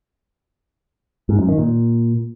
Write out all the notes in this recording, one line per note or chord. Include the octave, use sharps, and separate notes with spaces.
G#2
F#2
D#3
A#2